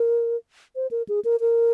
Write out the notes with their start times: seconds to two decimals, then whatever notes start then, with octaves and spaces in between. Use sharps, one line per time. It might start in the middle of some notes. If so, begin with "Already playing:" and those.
Already playing: A#4
0.76 C5
0.91 A#4
1.09 G#4
1.25 A#4
1.41 A#4